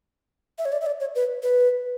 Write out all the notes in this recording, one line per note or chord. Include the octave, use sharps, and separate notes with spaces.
E5
C#5
D5
E5
D5
C#5
B4
B4